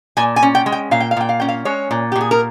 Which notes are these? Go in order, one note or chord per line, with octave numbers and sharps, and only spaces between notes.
A#2 G#5
G#5
C#4
G5
G#3
G5
A#2 F5
G5
F5
A#2 G5
F5
C#4 G5
F5
G#3 C#5
A#2
G4
A#2
G#4
A#4